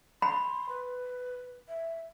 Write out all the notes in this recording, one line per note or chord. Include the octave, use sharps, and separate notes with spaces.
B5 C6
B4
E5